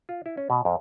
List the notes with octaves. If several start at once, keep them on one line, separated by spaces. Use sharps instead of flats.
F4
E4
C#4
B2
F2